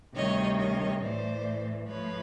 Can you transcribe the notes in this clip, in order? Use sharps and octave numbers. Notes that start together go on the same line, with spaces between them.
D2 C3 D#3 G3 C#5 D#5
C#5 D#5
A2 E3 A3 C5 D5
G#2 F3 A3 B4 C#5